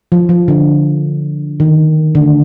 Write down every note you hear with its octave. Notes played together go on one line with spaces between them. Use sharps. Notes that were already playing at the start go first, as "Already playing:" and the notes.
F3
F3
D3
D#3
D3